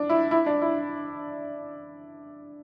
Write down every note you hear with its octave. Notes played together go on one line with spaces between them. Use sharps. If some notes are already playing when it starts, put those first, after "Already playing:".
Already playing: D4
E4
E4
D4
E4